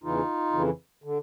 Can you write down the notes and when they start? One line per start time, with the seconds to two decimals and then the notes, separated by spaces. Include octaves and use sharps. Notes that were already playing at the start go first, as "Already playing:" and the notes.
0.04 E2 C#3 E3 D#4 F4
0.53 F2 C#3 E3
1.04 D3